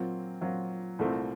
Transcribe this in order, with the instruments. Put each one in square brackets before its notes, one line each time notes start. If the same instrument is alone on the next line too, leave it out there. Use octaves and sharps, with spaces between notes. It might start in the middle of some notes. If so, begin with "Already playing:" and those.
Already playing: [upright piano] A#2 F#3 C4 F4
A#2 F#3 C4 F4
C2 A#2 A3 C4